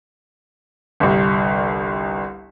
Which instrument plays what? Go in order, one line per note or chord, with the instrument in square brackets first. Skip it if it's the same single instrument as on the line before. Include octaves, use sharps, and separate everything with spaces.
[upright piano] G1 C2